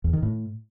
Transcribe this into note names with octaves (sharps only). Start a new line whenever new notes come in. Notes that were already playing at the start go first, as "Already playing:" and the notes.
E2
D#3
A2